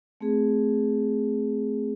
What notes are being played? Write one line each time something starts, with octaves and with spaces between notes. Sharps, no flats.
A3 C4 G#4